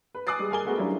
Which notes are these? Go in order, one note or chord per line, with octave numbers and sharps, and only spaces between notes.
B4
G#5 D6 D#6 F#6 A6 C7
G3 G#3
G#4 A#4 G#5 G7
G#3 A3 B3 F#4 G#4 A#4
F#3 G3 C#4 D4 E4 F4